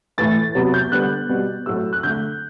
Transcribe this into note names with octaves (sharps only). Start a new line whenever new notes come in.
A2 E3 A3 A6
C3 F#3 B3
G6
D3 G3 B3 F#6
B2 G3 B3
A2 F#3 A3 E6
F#6
D3 A3 G6